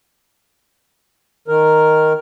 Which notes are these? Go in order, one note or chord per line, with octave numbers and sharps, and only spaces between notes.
D#3 A#4